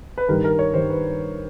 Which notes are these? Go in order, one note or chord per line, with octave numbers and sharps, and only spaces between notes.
B4
G2 D#3 G3 A#4
A#4
C#5
G2 D#3 G3 C5
B4